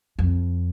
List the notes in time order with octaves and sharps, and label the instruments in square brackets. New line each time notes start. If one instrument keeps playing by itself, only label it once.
[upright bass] F2